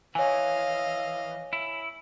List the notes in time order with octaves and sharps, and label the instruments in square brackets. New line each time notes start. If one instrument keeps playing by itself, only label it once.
[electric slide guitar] E3 [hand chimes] C#5 G#5 [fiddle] D#5 F5
[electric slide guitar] E4